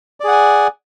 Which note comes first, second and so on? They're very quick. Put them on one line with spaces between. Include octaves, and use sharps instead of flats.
D5 G#4 F#5 G#5